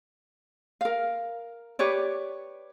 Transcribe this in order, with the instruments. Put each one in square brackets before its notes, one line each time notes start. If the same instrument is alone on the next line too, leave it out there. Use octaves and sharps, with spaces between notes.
[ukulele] A#4 F5
G4 B4 C#5 D5